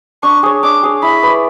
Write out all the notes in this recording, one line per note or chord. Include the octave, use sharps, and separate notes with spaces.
D4 C#6
G#4 C#5
D4 D6
G#4 C#5
E4 B5
B4 D5